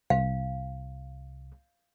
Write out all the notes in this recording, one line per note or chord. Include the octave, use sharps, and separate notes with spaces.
C2 F5